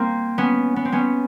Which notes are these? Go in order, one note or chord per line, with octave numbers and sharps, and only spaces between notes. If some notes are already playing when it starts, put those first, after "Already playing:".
Already playing: A#3 C4
B3 C#4
B3
C4
B3 C#4